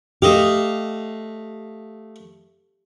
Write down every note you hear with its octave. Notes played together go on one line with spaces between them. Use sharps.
A3 G4 D#5 F5